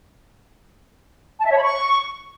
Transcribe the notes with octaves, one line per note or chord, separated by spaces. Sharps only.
A5
E5
C#5
B5
C#6